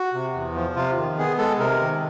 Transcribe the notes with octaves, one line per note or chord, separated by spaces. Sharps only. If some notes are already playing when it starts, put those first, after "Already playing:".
Already playing: F#4
C3
E2
F3
C3 F4
D#3
B3 G#4
G#3 A4
C3 A#4
D#3